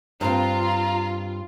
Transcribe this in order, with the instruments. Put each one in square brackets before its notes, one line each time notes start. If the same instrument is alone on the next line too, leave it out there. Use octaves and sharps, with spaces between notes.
[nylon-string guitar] G2 C4 [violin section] F4 [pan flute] A#5